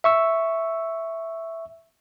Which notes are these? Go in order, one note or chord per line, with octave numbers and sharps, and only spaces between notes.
E5 C#6 E6